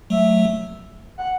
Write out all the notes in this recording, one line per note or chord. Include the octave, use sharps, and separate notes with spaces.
F#3 A3 E5
F#5